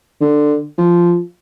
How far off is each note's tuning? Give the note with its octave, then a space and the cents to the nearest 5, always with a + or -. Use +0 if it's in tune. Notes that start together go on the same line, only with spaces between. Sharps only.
D3 +15
F3 -10